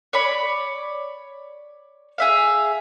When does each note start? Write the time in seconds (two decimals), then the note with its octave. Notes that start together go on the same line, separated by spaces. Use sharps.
0.13 C#5 D5 B5
2.18 G#4 E5 F5